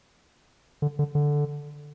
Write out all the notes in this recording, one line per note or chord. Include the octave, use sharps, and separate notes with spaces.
D3
D3
D3